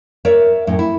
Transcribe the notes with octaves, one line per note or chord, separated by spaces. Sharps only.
A#4 C#5 D5 E5
F#2 A2
E4